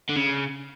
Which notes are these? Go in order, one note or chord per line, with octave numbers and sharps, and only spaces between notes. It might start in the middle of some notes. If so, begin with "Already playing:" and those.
D3
C#3